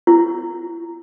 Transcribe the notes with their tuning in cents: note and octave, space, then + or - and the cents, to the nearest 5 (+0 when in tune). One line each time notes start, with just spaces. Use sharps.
E4 +40